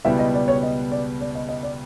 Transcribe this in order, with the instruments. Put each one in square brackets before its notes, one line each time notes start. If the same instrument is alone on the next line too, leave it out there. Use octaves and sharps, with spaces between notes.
[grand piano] C#2 B2 G3 B3 E4 [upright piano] E5
[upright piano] D#5
D5
C#5
D#5
D5
D5
D#5
D#5
D5